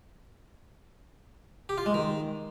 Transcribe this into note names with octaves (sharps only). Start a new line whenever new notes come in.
G4
F4
G#3
D#3